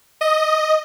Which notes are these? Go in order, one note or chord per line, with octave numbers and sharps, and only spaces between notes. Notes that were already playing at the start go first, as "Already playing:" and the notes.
D#5